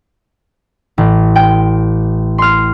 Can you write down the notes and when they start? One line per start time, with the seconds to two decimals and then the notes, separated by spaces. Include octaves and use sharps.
0.98 A1
1.36 G5
2.38 C6 F6